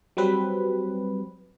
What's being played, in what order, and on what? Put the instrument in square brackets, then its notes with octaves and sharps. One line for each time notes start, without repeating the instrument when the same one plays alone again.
[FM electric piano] F#3 G3 C4 B4